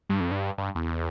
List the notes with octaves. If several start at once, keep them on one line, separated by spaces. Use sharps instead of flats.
G2
F2
G2
G2
E2